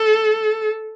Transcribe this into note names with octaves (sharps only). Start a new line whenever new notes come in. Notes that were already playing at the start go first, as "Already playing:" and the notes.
Already playing: A4